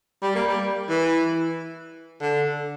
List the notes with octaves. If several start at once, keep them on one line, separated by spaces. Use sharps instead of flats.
G3
A#3
G3
E3
D3